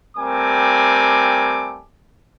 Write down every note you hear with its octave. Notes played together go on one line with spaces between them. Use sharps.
G3 A3 C4 A#4 G#5 D6